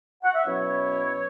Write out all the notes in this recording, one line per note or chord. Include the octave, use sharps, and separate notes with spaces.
F#5
E5
B2 F#3 C#4 E4 C#5